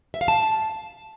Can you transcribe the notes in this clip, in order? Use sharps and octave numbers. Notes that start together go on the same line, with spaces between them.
E5
F5
A5